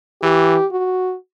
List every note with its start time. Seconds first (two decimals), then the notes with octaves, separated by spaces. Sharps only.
0.22 E3 G4
0.71 F#4